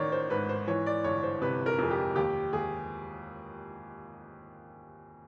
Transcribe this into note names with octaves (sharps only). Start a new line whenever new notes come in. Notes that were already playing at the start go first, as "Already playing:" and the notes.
Already playing: A1 D#3 C#5 D5
C5
G#2 B4
C5
E3 C#5
D5
G1 C#5
C5
C3 B4
A#4
F2 G#4
G4
D#2 G4
D#2 G#4